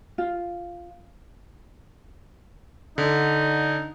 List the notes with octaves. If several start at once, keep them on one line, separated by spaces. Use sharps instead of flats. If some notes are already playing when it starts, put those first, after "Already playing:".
F4
D3 D#4